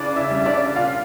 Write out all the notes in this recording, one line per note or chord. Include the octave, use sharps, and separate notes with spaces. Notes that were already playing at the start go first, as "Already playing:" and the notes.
Already playing: C#3 E3 D4 D5
E4 E5
G3
E5
D4 D5
A#2 F4 F5